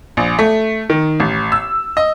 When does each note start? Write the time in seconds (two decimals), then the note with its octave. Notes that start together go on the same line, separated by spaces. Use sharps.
0.17 A#1
0.39 A3
0.90 D#3
1.20 A1
1.52 E6
1.97 D#5